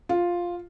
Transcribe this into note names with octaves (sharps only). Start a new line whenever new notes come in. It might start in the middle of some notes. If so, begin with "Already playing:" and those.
F4